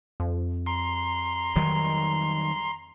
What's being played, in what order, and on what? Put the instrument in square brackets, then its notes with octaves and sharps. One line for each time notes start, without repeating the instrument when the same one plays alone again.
[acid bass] F2
[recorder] A#5 [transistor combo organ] C6
[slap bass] D#3 F#3 G3